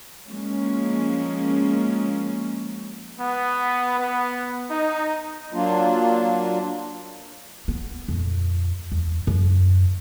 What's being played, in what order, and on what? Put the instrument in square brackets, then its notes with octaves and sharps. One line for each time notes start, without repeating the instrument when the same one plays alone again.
[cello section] F3 G#3 A#3 C#4
[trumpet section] B3
B3
D#4
[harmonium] F#3 A#3 D4 F4
[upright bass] B3
F2 A#2
E2
F#2